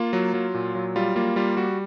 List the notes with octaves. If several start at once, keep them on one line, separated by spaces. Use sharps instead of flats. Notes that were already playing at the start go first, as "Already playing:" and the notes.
Already playing: A#3 F4
F#3
F#3
A#2
F#3
G3 F4
A#3 F4
G3 F4
G3 F#4